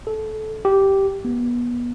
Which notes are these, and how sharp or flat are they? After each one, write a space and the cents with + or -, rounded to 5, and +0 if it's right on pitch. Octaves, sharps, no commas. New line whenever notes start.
A4 -20
G4 -10
B3 -30